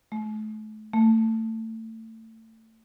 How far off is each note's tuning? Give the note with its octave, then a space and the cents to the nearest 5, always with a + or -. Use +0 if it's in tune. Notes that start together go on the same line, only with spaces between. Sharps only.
A3 -35
A3 +25